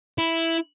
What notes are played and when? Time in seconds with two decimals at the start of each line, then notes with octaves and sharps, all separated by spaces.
0.18 E4